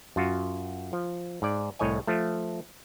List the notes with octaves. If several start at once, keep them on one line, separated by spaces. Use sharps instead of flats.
F#2 F4 F#4
F3
G#2 D5
C2 A2 C#5 D#5 G#5
F3 A3